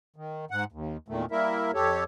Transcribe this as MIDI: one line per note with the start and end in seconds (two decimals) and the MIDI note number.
0.16 0.45 51
0.51 0.64 44
0.51 0.64 78
0.72 0.97 39
1.08 1.26 40
1.08 1.26 46
1.08 1.26 51
1.08 1.26 57
1.31 1.71 55
1.31 1.71 58
1.31 1.71 64
1.31 1.71 70
1.31 1.71 76
1.74 2.04 41
1.74 2.04 67
1.74 2.04 69
1.74 2.04 73